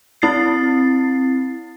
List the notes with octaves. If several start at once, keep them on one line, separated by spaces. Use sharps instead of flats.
C4 E4 A6 C7